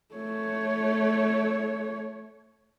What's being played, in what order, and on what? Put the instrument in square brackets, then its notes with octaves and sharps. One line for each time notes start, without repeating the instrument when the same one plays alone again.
[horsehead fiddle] A3 C#5